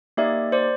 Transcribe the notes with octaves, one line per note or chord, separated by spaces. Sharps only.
A#3 D#4 G4 D5 E5
C5 D5